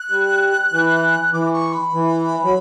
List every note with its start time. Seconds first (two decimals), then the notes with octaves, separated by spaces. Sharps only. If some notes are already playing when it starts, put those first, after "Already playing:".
Already playing: F#6
0.10 G3
0.72 E3
1.32 E3 D6
1.53 C#6
1.73 B5
1.93 E3
2.44 F#3